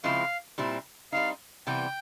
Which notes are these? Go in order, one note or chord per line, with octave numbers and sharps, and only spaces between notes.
C#3 F3 G#3 C4 E4 F5
A#2 G3 C4 E4
G3 C4 D#4 F5
C3 E3 G3 B3 G5